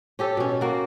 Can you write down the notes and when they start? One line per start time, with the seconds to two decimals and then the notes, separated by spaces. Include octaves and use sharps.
0.19 C#4 G4 A4
0.37 B2 C#4
0.61 A#3 F#4